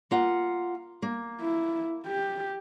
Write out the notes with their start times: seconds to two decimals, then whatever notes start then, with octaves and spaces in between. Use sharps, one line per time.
0.11 A#3 F4 F#5
1.02 A#3
1.41 E4
2.06 G4